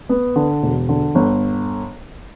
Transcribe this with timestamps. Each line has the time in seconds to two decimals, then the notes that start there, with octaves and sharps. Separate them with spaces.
0.09 B3
0.36 D3
0.63 E1
0.89 D3
1.15 G1